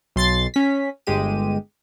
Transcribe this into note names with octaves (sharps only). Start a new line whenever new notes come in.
B1 C6 A6 C7
C#4 B6
G1 G#3 G4 D#7